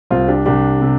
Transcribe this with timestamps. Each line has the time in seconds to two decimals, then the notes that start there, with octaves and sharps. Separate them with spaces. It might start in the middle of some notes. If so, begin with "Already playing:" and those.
0.11 C2 C4 F4
0.28 D4 G4
0.45 C2 D4 G4
0.82 C3